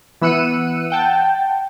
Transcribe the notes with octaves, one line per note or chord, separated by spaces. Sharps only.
E3 B3 E6 F#6 C#7 D#7
F#5 G5 A5